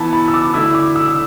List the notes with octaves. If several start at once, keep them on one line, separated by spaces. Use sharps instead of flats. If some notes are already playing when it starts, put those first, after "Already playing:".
Already playing: E3 B3 E4 A5
B5
E6
D6
D3 A3 E4 E6
D6
E6
E6